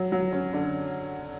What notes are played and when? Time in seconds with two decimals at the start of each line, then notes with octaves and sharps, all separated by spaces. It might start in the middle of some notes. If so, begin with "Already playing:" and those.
Already playing: F#3
0.12 F#3
0.32 C#4
0.53 D3